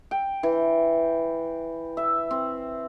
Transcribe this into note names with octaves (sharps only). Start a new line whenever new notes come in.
G5
E3
E5
C4